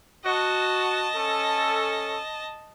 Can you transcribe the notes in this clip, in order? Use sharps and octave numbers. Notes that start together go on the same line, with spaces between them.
F#4 D#5 A5
C#4 A4